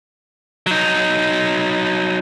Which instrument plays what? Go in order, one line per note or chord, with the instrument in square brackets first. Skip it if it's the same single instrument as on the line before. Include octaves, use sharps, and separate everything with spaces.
[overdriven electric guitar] F#3 D#4